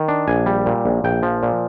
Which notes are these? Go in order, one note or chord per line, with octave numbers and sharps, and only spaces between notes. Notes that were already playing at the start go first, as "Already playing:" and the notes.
Already playing: D#3
D4
A#1 G#5
G3
A#2
A#1
A#1 G5
F3
A#2